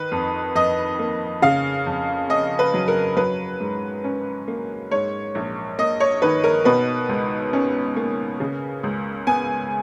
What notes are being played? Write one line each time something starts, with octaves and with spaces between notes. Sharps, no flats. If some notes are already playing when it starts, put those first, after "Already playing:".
Already playing: D#3 B4
F2
F2 D#5
A#3
C#3 F5
F2
C#4 D#5
B4
F#3
A#4
F#3 B4
G#2
C#4
A#3
G#2 C#5
A#1
A#3 D#5
C#5
D#3 B4
A#4
B2 B4
C#2
C#4
A#3
C#3
C#2
B3 G#5